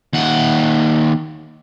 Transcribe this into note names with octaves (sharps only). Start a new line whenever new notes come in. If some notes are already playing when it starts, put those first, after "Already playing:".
D#2 F#5